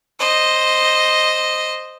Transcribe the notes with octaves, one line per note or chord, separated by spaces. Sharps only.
C5 D#5